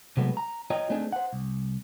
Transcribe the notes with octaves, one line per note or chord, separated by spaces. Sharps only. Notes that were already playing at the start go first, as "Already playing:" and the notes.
C3 F#3 G#3 A3 B3
A#5
F4 C#5 D#5 G5 A#5
A3 C4 D4 D#4 G#4
C5 F#5
C2